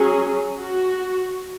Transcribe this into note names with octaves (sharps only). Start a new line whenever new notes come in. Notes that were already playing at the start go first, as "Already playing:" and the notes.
Already playing: F#3 C#4 G#4
F#4